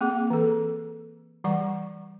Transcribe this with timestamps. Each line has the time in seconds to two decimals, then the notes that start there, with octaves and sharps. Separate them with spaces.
0.01 A#3 C4 G#4
0.30 E3 A4
1.44 E3 G3 F#5 C#6